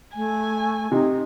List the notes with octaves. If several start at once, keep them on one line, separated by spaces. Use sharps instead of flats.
A3 G#5
C3 D#4